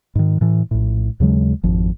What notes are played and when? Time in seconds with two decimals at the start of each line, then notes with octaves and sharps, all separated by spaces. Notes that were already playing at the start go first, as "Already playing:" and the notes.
0.15 G#2 D#3
0.41 A2 E3
0.71 A#1 A2
1.20 D#2 C#3 F#3 G#3
1.64 G#1 F2 F3